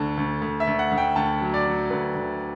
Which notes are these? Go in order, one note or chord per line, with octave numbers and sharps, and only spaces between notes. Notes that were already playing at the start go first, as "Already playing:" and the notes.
Already playing: D2 D3 A5
D2
D2
E5
D2
F#5
D2
G5
D2 A5
F#3
D5
F#3
D2 B4
D2